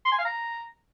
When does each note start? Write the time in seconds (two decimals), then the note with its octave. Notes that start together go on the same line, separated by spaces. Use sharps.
0.05 C6
0.12 G#5
0.18 F5
0.25 A#5